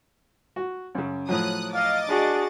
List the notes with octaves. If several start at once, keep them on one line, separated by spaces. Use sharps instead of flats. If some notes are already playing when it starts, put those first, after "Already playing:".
F#4
F#2 C#3
A2 F3 F#3 D#6 F#6
D#5 F5 D6 A6
D4 F#4 G#4